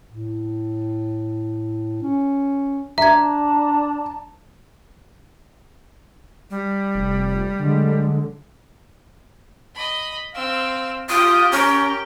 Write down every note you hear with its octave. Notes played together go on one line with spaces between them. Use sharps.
A2
C#4
D4 E5 A5 A#5 G#6
G3
F1
D3 F#3 G#3
D#5 B5
C4 F5 E6
F4 G4 G5 D#6
C#4 A#4